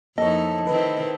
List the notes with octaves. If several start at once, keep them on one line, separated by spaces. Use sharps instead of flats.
F2 A#3 D#4 E4 A4 C#5 D#5
D#3 C4 E4 B4